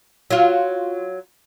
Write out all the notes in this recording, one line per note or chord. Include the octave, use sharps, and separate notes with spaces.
F#3 F4